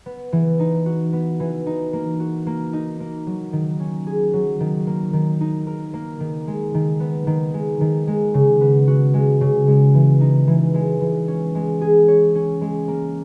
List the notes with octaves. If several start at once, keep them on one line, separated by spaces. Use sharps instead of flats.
B3
E3
D#4
F#4
B3
E3
D#4
A#3
F#4
A#3
D#4
A#3
F#3
D#3
C#4
G#4
F#3
D#3
A#3
D#3
D#4
A#4
A#3
D#3
G#3
D#3
B3
D#3
G#3
D#3
G#3
C#3
B3
F#4
G#3
C#3
G#3
E3
D#4
E3
G#3
E3
C#4
G#3
G#4
C#5
C#4
G#3
A#3